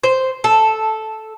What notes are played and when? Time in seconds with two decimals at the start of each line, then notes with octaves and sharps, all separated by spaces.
0.04 C5
0.44 A4